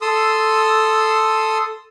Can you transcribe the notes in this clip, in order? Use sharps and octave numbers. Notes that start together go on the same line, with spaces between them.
A4 C6 D#6 E6